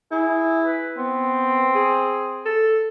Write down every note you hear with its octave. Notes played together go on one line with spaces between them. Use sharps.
E4 G#4
B4
B3 C4
G#4
A4